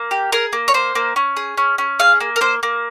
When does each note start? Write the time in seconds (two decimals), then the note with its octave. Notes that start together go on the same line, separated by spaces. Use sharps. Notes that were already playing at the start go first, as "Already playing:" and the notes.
Already playing: A#3
0.11 G4
0.32 G#4 A#4
0.53 A#3
0.68 C#5
0.74 A#3 C5
0.95 A#3
1.16 C#4
1.37 G#4
1.57 C#4
1.78 C#4
1.99 G#4 F5
2.20 A#3
2.36 A#4
2.41 A#3 C5
2.63 A#3